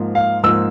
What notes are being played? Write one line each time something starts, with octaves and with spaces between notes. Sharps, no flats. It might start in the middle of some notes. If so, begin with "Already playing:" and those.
Already playing: G#2 F3 A#3
F5
G#2 F3 A#3 E6